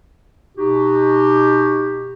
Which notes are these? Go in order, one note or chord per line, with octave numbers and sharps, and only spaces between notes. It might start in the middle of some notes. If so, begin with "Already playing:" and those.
B2 D#4 F#4 G4